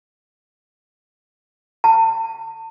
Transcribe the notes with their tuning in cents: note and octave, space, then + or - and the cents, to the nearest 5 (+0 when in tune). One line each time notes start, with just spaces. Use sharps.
A5 +40